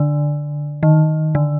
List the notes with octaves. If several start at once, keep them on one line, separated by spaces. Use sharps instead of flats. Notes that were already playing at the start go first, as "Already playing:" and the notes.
Already playing: D3
D#3
D3